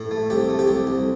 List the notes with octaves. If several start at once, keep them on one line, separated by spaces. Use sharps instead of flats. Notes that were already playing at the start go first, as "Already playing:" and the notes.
Already playing: A2
A3
C2 G4
A3
G4
C2
C2